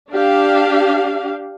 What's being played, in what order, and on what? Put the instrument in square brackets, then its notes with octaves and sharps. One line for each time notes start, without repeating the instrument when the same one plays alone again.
[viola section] D4 G4 F5